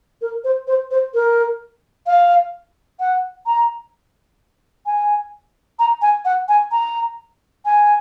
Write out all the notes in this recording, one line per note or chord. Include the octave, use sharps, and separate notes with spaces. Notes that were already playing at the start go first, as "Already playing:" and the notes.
A#4
C5
C5
C5
A#4
F5
F#5
A#5
G#5
A#5
G#5
F#5
G#5
A#5
G#5